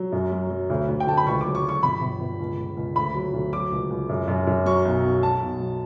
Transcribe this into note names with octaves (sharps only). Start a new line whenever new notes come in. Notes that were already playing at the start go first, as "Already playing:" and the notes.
Already playing: F#3
F#2
F#3
F#3
D2
D2
G5
D2 A5
B5
C#2 C#6
F#3 D6
C#6
F#3
C#6
G1 B5
G1
G1
C#2
C#2
C#2
D2 B5
F#3
D2
F#3 D6
C#2
C#2
F#2
F#2
F#2
F#3 C#6
B1
B1
F#3 A5
B1
F#3